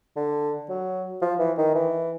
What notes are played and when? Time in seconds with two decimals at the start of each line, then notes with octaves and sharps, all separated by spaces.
0.16 D3
0.69 F#3
1.22 F3
1.39 E3
1.58 D#3
1.75 E3